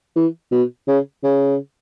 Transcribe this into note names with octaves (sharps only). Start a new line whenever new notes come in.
E3
B2
C#3
C#3